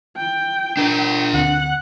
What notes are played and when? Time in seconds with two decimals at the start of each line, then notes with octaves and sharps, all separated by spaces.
0.17 G5
0.77 D4 A#4
1.33 D2 C4 F#5